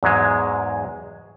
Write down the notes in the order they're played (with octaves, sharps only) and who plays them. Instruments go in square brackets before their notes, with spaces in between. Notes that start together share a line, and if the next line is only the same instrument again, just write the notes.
[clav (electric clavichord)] E2 G#2 F#3 G#3